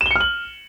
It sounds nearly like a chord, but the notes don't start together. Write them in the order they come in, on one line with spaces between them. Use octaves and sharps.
E7 G7 C#7 F6 F#7